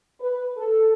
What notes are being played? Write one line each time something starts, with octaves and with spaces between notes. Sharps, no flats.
B4
A4